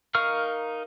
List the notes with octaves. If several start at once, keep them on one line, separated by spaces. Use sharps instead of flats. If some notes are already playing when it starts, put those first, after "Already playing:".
D#4 A#4 F5 C#6 F6